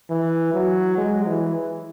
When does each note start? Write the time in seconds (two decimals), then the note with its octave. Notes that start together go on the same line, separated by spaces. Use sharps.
0.10 E3
0.53 F#3
0.98 G#3
1.27 E3